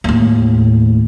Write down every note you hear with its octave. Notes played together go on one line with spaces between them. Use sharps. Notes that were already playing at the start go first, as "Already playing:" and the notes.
D#2 A2